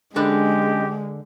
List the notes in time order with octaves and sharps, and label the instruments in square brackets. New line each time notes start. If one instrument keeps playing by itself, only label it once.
[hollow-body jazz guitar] D3 D4 B4 [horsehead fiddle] G#3 [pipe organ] C#4 G#4 D#5 [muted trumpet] G4